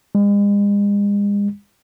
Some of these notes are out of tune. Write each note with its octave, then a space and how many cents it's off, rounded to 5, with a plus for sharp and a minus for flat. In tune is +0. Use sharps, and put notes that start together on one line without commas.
G#3 -40